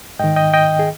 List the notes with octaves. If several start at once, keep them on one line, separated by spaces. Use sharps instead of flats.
G#2 D#3 D#5 G5
D#5 G5
D#5 G5
G#4